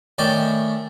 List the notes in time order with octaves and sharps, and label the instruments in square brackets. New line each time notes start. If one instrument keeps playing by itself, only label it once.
[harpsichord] A2 D#3 C#4 D5 G5